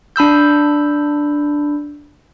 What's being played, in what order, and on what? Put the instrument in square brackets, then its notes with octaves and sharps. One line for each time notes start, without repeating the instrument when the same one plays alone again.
[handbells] D4 B5 E6 G6